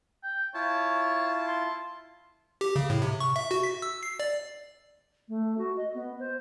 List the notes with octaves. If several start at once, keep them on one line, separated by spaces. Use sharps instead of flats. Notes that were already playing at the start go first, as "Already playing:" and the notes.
G5
E4 F4 C#5 A5
C6
G4
C#3
A2
C3
C#6
E5
F#4
B6
E6
C7
D5
A3
F#4
D#5
B3
C5